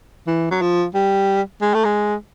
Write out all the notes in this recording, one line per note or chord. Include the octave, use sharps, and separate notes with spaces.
E3
F#3
F3
G3
G#3
A3
G#3